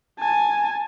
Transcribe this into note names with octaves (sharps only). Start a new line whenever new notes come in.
G#5 A5